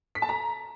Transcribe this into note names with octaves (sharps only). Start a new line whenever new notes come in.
B6
A5
A#5